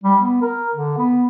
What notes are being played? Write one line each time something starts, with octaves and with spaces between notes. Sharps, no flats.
G3
B3
A#4
D3
B3